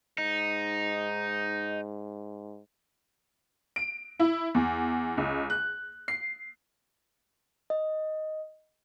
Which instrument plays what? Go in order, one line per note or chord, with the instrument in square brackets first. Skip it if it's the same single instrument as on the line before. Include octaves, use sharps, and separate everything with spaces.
[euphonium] G#2 [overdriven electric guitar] D#4
[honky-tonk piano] D7
E4
E2
C#2
F#6
C7
[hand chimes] D#5